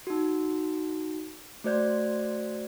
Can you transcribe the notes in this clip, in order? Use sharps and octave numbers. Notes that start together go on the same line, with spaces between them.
D#4 F#4
A3 F#4 C5 D5 G6